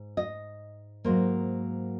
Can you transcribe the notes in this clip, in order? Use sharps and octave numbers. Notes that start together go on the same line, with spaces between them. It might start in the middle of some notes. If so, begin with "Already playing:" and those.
Already playing: G#2
D#5
G#2 F#3 A#3 C5